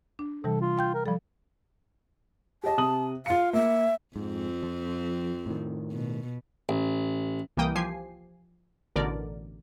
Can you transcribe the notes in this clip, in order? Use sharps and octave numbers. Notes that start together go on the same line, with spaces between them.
D4
C3 E3 G3 A4
F4
F5 G5 G6
A#4
F3 G3 A4
G4 D#5 A5
C3 D#6 F#7
F4 F5 C#7
A#3 E5
F2 G#2 C4
F3
A2 D#3
B2
A1
C2 E3 A#3 G5 D#6
F3 G4 G#5 C7
A1 B2 D3 A#4 D5